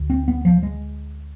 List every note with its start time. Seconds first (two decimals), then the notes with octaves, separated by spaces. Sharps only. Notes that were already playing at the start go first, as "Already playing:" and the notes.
Already playing: D2
0.10 C4
0.28 B3
0.45 F3
0.63 G#3